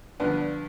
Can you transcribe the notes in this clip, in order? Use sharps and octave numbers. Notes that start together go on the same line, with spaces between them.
G2 D3 F3 B3 D4